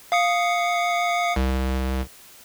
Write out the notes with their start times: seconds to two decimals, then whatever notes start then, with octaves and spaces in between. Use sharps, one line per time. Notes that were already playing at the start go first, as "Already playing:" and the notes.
0.12 F5 D#6 C#7
1.36 C2